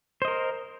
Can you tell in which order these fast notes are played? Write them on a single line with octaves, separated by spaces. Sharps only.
C5 D#5 A#4